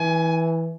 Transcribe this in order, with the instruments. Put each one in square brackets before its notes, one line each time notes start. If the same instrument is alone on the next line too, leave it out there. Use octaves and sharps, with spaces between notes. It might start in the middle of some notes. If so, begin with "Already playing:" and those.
Already playing: [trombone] E3 [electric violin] G#5